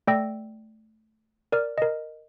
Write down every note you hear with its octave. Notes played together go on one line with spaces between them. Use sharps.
A3 D5 G5 E6 A#6
A#4 D5 F6
A#4 D#5